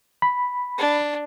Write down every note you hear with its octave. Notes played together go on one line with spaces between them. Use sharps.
B5
D4